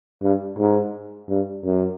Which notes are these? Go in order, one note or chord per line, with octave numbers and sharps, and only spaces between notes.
G2
G#2
G2
F#2